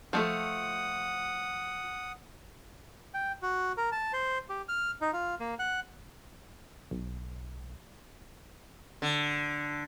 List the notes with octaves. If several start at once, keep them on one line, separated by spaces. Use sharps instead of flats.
F3 G#3 A3 F#5 D#6
G5
F#4
A#4
A5
C5
G4
F6
D#4
F4
A#3
F#5
B1
D3